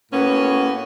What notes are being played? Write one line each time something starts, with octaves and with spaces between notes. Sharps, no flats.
A2 A#3 B3 C#4 F#4